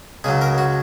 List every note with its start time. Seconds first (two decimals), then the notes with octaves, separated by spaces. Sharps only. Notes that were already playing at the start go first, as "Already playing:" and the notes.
0.24 C#2 C#3 F#3 G#4
0.41 A#4
0.58 F#4